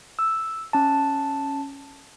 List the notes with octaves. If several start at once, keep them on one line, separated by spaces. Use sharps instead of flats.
E6
C#4 A5